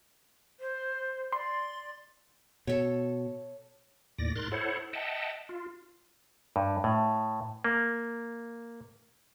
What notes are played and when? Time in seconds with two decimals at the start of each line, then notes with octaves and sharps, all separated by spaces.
0.60 C5
1.32 D5 C6
2.67 B2 A4 C#5
4.18 D#2 A2 D5 A#6
4.36 G#2 A#4 C6 F#6 A6
4.52 E4 A4 C5 C#5 F#5
4.93 D#5 E5 F#5 G5 A5
5.49 F4
6.56 G2
6.84 A2
7.64 A#3